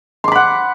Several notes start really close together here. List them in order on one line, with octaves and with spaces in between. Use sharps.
C6 D6 B5 F#5